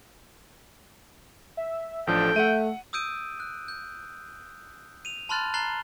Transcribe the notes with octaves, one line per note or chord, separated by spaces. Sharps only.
E5
A1 F3 D4 A4 G5
A3 E5 F#5 D#7
D#6 E6 G6 D7 D#7
F#6
G6
D#7 F7
A5 B5 C6 F6 F#6 A6
A#5 F#6 A6 C7 F#7 G7